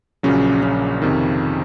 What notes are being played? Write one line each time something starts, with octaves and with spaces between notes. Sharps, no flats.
A#1 A#2 C#3 F#3 C#4
C#3 C#4
F2 C3 D#3